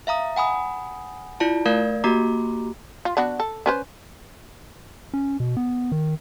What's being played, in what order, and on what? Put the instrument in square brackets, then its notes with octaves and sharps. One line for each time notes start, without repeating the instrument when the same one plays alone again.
[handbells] E5 F5 A#5 D#6
F#5 G#5 B5 D#6
E4 F4 D5 A5
A3 A#4 D5 F5 G#6
A#3 F#4 G4 A#5 D6
[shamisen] F4
B3 D4 F#4
A4
C#4 B4 C5
[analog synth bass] C#4
B2
B3
D#3